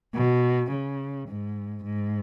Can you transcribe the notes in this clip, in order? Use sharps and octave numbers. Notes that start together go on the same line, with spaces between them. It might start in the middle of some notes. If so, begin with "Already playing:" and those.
B2
C#3
G#2
G#2